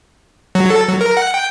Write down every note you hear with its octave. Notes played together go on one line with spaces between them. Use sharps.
F#3
A4
F#3
A#4
F#5
G5